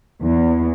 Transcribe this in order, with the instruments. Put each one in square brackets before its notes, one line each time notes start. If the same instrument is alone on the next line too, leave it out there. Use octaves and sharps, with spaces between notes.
[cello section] E2